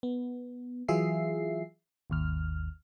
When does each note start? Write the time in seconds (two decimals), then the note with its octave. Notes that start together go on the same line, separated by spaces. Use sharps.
0.03 B3
0.88 E3 F#3 F4 G#4 E5 C7
2.10 G#1 D#2 F6